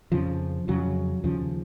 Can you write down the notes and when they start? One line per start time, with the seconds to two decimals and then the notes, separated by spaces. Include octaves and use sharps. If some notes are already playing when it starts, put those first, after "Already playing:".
0.12 F2 C#3 F3
0.68 F2 C#3 F#3
1.24 D#2 C#3 F3